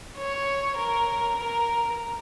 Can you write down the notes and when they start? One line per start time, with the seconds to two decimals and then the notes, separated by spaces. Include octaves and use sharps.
0.17 C#5
0.78 A#4
1.39 A#4